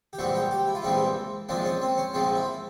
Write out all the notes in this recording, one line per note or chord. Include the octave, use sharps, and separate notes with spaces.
G4
A#1 G#2 E3 G3 C4 F#4
G4
G4
E4
F4
A#1 G#2 E3 G3 C4 E4
A#1 G#2 F3 G#3 C4 D4
C#4
C4
C#4
A#1 G#2 F3 G#3 C4
E4